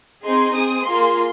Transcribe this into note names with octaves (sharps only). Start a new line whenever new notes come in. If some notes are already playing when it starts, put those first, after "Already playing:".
C4 D#4 G#4 C6
C4 G#4 D#6
A#3 F4 G#4 C6